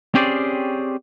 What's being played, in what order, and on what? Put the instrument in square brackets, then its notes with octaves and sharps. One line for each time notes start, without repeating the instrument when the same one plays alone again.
[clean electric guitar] C4 C#4 G4 G#4 C5 D5